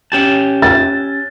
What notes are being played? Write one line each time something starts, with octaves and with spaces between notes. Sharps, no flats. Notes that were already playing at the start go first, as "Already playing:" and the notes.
C#4 G4 A5
A6